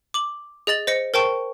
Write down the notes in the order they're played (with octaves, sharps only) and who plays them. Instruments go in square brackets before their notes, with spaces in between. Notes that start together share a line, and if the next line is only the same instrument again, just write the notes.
[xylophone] D6 F#7
G#4 D#5 A6 F#7
C5 D#5 A#6 C#7
A#4 C5 G5 A5 C#6